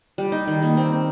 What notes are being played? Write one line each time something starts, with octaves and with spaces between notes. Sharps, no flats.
G3
D#4
D#3
A#3
C4
C4